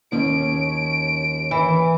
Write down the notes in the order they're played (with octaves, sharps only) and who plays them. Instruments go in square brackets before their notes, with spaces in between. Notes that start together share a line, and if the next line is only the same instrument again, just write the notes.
[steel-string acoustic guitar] D#2 C#4 [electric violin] D7
[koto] E3